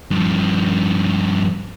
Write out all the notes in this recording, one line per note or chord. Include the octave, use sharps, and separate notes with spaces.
G2 F3